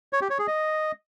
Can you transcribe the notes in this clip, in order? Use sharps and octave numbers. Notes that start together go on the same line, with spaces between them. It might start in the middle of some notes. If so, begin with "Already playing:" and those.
C#5
G4
C#5
G#4
D#5